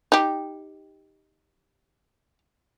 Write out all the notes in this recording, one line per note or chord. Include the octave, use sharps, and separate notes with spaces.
D#4 G4